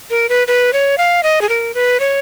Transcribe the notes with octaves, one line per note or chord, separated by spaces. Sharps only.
A#4
B4
B4
C#5
F5
D#5
G#4
A#4
B4
C#5